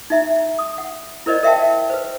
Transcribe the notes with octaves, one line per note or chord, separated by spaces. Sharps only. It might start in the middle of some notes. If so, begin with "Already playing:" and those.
D#4 E5 A#5
D#6
F#5
E4 A#4 C5 D5 D#5
A#4 E5 F5 G5 A5
B4 C5